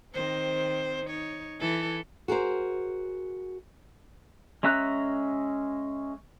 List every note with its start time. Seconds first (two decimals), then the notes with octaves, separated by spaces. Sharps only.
0.14 D#3 C4 C5
1.06 D#4 C#5
1.61 E3 E4 A4
2.28 F#4 G#4 A#4 C5
4.63 G#3 C#4 E5 A#5 F#6